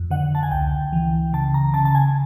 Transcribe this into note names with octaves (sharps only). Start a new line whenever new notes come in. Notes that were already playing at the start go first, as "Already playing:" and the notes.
Already playing: F2
D3 F#5
A5
G#5
C#2 G5
E3
C#3 A5
A#5
C#3 A5
A5
G#5